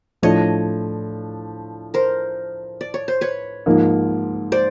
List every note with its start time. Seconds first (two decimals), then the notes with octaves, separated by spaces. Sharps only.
0.22 A2 F3 A3 D4 C#5 D#5
1.94 A#4 C5
2.81 D5
2.94 C#5
3.08 C5
3.21 B4 C#5
3.66 G#2 F3 A#3 D#4
4.52 C5 D5